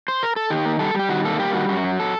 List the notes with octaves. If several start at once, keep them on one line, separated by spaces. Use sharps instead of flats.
C5
A#4
A4
D#3 G4
A#3
G3 A4
G3 G4
D#3 F#4
A#3 A4
G3 G4
D#3 F#4
F#2 F#4
F#3
A4